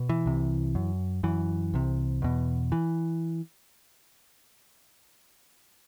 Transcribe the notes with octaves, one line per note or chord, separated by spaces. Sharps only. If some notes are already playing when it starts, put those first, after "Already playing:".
Already playing: B2
E3
C2 C3
F#2
F#2 E3
C2 C3
E2 B2
E3